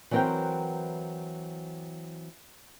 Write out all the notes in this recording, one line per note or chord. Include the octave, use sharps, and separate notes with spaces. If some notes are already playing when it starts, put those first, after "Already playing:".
E3 F#3 C4 A#4 C5 G5